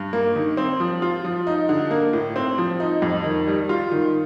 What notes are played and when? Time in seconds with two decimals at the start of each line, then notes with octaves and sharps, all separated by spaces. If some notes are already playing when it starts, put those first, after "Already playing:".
Already playing: G2
0.13 A#3
0.36 D#3
0.57 C4
0.80 F3
1.02 F4
1.24 F3
1.47 D#4
1.69 D3
1.91 A#3
2.13 A2
2.36 C4
2.58 F3
2.80 D#4
3.02 F2
3.24 D#3
3.47 G3
3.69 F4
3.92 D#3